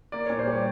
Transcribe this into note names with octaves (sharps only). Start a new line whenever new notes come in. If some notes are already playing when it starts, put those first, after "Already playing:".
A#3 D5
A#2 C#5
C5
G3
C#5